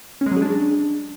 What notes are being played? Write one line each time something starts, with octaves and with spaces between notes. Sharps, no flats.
C#4
G#3
F#3
G#4
D4